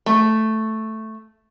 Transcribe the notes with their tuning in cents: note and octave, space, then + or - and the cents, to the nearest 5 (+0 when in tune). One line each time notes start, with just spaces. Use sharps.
A3 +0